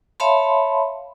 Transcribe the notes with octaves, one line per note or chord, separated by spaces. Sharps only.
C#5 E5 F5 A5 B5 C6